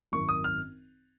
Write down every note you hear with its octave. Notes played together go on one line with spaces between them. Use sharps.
G#1 F#2 D#3 C#6
D#6
F6